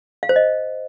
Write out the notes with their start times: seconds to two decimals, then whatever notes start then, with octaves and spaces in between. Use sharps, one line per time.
0.23 F5
0.29 C5
0.36 D#5